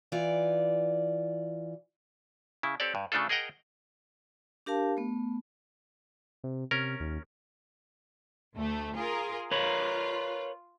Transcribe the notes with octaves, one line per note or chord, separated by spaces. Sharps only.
E3 F4 D5
C#3 E4
C4 G4 A4 C#5 D5
G2
C#3 A3 D4 F4 A4
G#4 A#4 D#5 F#5 G5 A#5
D4 G4 A#4 F5 A5
A3 B3
C3
C3 C#4 A#4
D#2
D2 A3
F4 G#4 A#4
F4 A#4 B4 C#5